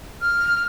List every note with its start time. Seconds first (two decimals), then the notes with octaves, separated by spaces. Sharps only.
0.21 F6